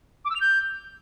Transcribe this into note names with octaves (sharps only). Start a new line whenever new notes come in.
D6
E6
F7
G6